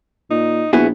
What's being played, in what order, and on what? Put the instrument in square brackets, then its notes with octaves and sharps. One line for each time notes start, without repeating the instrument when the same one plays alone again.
[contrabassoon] A#2 [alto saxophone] D#4
[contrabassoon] A#1 [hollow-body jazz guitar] B3 E4 G#4 [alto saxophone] F#4